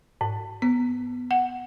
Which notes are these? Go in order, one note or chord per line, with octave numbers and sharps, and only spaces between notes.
G#2
B3
F#5